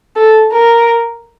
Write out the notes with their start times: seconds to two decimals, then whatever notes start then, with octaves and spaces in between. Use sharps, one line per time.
0.16 A4
0.53 A#4